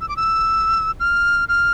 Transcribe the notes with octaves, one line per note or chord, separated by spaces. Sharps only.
E6
D6
E6
F6
F6